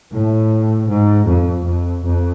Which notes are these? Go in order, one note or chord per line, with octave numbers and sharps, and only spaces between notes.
A2
G#2
F2
F2
F2